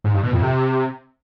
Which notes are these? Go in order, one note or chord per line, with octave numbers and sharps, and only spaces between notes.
G#2
G2
B2
F2
C3